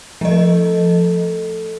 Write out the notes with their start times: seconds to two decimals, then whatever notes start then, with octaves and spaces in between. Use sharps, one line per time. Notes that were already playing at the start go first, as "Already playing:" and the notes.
0.21 F3 A3 D#5